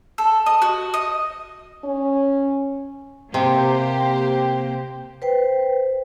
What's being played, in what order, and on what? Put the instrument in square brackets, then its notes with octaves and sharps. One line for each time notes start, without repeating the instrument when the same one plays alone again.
[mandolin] A4
D#5
F#4
D#5
[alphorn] C#4
[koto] C3 [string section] A#3 G4 C5
[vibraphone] B4 C5 G5